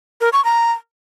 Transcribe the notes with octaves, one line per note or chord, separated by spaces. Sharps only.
A#4
C#6
A#5